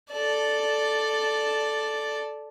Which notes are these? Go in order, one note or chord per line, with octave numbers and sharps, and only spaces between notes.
A4 D5